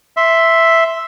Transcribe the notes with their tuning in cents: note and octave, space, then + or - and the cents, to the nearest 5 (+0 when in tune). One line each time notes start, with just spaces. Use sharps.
E5 +0 C6 +0